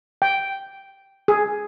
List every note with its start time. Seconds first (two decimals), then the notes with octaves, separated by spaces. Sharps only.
0.22 G5
1.28 G#4